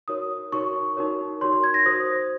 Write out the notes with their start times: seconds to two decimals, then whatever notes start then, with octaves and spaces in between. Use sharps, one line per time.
0.08 D#4 F#4 A#4 C#5 D#6
0.52 D#4 F#4 A#4 C#5 C#6
0.97 D#4 F#4 A#4 C#5
1.41 D#4 F#4 A#4 C#5 C6
1.53 C6
1.64 G#6
1.74 A#6
1.86 F#4 C5 D#6